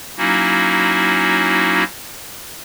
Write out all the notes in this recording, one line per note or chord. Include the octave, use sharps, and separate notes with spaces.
F#3 A#3 C#4 D#4 E4 F#4